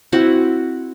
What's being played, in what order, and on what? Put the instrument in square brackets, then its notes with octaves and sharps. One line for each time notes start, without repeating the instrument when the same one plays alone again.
[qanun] C4 E4 F#4 F#5